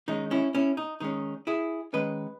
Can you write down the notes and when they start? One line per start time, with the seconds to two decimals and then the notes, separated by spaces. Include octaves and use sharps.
0.08 D#3 G#3 C#4 D#4
0.31 C#4 E4
0.55 C#4 E4
0.77 D#4
1.00 D#3 G#3 C#4 D#4
1.47 E4 G#4
1.93 D#3 G#3 C#4 B4 D#5